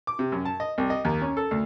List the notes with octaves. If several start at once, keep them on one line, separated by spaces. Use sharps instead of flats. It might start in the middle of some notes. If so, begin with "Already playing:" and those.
D6
C3
F#2
A5
D#5
C2
D#5
D#2
C#4
A4
D2